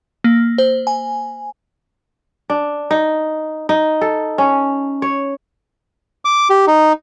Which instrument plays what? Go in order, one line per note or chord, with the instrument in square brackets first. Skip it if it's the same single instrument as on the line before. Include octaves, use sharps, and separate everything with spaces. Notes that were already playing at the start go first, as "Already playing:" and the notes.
[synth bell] A#3
C5
G#5
[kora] D4
D#4
D#4
A4
C#4
C#5
[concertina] D6
G4
D#4